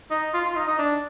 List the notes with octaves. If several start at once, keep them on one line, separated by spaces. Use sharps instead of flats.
D#4
F4
F4
D#4
D#4
D4